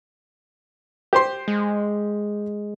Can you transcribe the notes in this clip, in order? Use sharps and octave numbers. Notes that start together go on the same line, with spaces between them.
G4 C5 C6
G#3